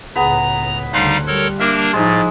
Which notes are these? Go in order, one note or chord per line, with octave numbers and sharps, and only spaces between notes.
C#2 A2 B3 G#4 B4 A#5
D2 C#3 G3 D#4 F5 F#5 A5 C6
G3 A4 A#4 C#5
A#3 D4 A#4 E5 D6 E6
A2 F3 G#3 D#4 A6